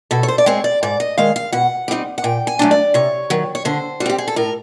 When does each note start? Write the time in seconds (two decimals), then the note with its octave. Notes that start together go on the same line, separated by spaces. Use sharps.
0.11 B2 A4
0.23 C#5
0.28 C5
0.38 D5
0.46 G#3 C4 C#5
0.64 D5
0.83 G#2 D5
1.00 D#5
1.18 D#3 G#3 F5
1.36 F5
1.52 B2 F#5
1.88 G3 C4 D#4
2.18 F#5
2.24 A#2 G5
2.47 G#5
2.59 F#3 A3 D4
2.71 D5
2.94 C3 C#5
3.30 D#3 F#3
3.55 C#5
3.65 D3 C5
4.00 G3 F#4
4.06 C4 G4
4.18 G#4
4.28 A4
4.36 A2 A#4